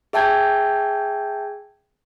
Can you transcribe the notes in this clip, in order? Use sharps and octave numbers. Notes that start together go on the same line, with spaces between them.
G#4 E5 G5 A5 G6 G#6